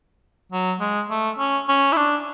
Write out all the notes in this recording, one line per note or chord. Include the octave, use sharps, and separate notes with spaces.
F#3
G#3
A3
C#4
C#4
E4
D4